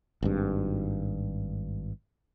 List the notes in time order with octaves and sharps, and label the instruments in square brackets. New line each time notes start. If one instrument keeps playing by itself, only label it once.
[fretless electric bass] G#1 G2